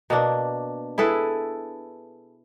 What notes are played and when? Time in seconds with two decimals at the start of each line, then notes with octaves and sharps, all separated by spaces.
0.10 B2 A#3 D4
0.98 E4 G#4 A4 B4